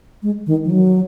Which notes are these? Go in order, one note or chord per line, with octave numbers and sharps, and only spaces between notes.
G#3
D#3
F3
F#3